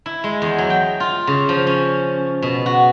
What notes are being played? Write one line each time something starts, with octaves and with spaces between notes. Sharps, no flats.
E4
G#3
E2
F#3
G5
F4
C#3
F3
C#4
B2
F#4